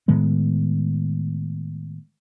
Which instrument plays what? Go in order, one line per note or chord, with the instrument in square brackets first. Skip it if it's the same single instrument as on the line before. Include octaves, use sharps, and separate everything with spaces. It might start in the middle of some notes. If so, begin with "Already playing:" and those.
[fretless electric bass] A2 D#3 G#3 B3